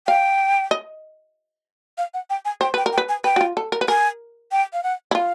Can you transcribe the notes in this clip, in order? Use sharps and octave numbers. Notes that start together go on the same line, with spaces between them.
F5 G5
D#5
F5
F#5
G5
G#5
C5 G5
B4 G5
A#4
G5
B4
G#5
B4 G5
F#4
F4
A4
A#4
B4
A#4 G#5
G5
F5
F#5
E4
F4 F5